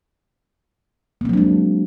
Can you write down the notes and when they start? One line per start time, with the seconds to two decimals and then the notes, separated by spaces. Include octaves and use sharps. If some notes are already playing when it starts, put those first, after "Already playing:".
1.21 A#3
1.25 C4
1.29 F#3
1.33 D4
1.37 G#3